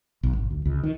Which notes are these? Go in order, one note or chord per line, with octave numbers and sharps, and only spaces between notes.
B1
G#1
D2
C#2
D#3